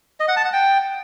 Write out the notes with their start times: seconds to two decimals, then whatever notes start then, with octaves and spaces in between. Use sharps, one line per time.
0.20 D#5
0.28 F#5
0.36 A5
0.45 F#5
0.53 G5